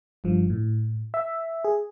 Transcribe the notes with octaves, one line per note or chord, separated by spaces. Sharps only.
G1 G2 F3
A2
E5
G#4